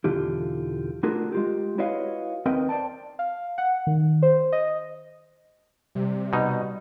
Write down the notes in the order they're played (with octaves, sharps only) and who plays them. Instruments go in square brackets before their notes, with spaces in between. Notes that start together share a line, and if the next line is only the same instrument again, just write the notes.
[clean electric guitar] B1 E2 D3 E3 F4 G4
A3 D4 F4 F#4 G#4 A#4
G#3 F4 G4
E4 F#4 B4 C#5 D#5 F5
D#2 C4 A#4 B4 D#5 G5
C5 D5 G5 A5
[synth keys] F5
F#5
D#3
C5
D#5
[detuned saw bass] C3 [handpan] G3
[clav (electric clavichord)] B2 D#4